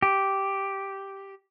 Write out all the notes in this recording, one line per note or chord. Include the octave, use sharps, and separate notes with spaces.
G4